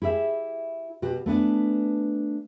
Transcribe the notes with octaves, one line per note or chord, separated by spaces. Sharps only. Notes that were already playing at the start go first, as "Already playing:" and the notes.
E4 G4 G#4 E5
B2 F#4 G4
A3 B3 D4 G#5